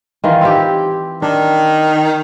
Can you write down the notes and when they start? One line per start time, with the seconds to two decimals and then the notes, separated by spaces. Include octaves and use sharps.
0.24 D#3 E3 F4
0.41 C4 E4 G4
1.22 D#3 D4